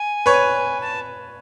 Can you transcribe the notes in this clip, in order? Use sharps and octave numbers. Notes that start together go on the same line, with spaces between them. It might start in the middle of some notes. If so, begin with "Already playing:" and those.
Already playing: G#5
B4 C#5
A5